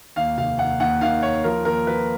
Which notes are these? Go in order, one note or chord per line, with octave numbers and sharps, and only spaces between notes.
D#2 F5
F1 F5
D#2 F#5
D#2 F#5
D#3 F5
D#2 C#5
F3 A#4
D#2 A#4
F3 B4